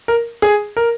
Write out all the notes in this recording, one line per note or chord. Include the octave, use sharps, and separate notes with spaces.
A#4
G#4
A#4